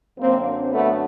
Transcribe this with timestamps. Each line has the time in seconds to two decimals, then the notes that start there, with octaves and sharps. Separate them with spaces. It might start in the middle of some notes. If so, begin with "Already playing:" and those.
0.19 F#2 D3 F#3 A#3 C4
0.71 A3 B3